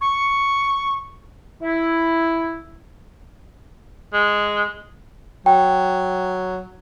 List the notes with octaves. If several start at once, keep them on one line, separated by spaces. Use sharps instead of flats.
C#6
E4
G#3
F#3 G5